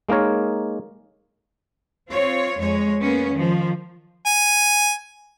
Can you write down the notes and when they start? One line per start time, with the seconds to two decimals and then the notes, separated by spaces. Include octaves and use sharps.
0.09 G#3 A#3 D#4 A#4 C#5
2.11 C4 F4 C#5
2.57 F2 G#3 C#5
3.02 A#3 B3 C#4
3.32 D#3 F3
4.26 G#5